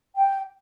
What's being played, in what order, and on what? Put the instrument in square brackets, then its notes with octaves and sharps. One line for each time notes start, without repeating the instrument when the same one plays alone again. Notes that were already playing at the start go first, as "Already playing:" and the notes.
[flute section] G5